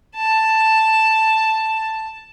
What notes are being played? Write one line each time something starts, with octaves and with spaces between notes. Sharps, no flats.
A5